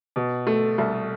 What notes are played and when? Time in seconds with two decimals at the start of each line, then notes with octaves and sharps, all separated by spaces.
0.16 B2
0.47 A3
0.78 C2